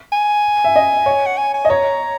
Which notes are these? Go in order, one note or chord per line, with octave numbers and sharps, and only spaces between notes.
G#5
E5
D#5
C#5
F#5
G#5
G#5
D#5
C#5 A#5